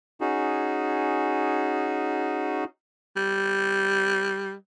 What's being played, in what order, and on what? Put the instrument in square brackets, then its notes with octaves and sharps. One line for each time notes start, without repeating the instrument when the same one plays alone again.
[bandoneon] C#4 D#4 F#4 G#4
[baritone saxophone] G3